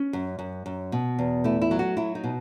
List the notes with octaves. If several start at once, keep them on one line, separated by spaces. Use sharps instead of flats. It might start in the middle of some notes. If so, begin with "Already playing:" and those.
Already playing: C#4
F#2
F#2
F#2
B2
E2
A3 E4
E4
F#3
F#4
F#3 E4
D#4
B2